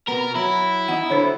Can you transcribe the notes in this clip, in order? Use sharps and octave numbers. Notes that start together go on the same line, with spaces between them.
B2 B3 A#4
F#3 E4
E2 D#4 F#5
D3 F#3 D4 C5 C#5